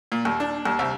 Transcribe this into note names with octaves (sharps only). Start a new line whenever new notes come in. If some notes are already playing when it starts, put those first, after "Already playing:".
A#2
D#2
D4
D#2
C2